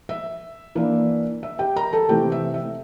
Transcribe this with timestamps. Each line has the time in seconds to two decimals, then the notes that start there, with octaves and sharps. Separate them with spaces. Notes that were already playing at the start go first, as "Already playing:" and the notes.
0.09 E5
0.75 E3 A#3 D4
1.43 E5
1.59 G4 G5
1.76 A#4 A#5
1.93 A4 A5
2.09 C3 E3 A3 C4 G4 G5
2.32 E5
2.54 E5